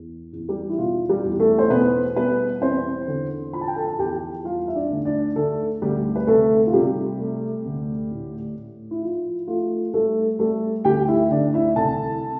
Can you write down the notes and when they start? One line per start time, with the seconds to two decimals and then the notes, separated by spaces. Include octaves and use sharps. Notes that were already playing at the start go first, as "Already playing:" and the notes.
Already playing: E2
0.33 E2
0.48 G3 G4
0.70 E4
0.79 B2 F4
1.09 G3 G4
1.24 E2
1.40 A3 A4
1.59 C5
1.70 B2 B3 B4
2.16 G3 B3 B4
2.61 E2 C4 C5
3.07 D3
3.53 F3 B5
3.61 A5
3.68 G5
3.76 A4 A5
3.88 A5
3.99 E2 G4 G5
4.44 G3 F4 F5
4.68 E5
4.75 D4 D5
4.90 D2
5.05 D4 D5
5.36 D3 A3 A4
5.82 D2 G3 G4
6.16 B4
6.27 C3 A3 A4
6.67 F4
6.73 C3 G3 G4
7.19 A3
7.66 D2
8.11 A2
8.56 A2
8.91 E4
9.02 F3 F4
9.47 A3 F4
9.94 G3 A3 A4
10.39 G3 A3 A4
10.85 D2 G4 G5
11.08 E4 E5
11.31 D2 D4 D5
11.54 E4 E5
11.76 C2 A4 A5